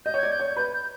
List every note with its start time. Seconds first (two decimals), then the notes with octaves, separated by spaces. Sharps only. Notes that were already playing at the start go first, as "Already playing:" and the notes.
0.05 D#5 G6
0.14 C#5
0.19 D5 G#6
0.32 G6
0.40 C#5
0.56 B4 G6
0.74 G6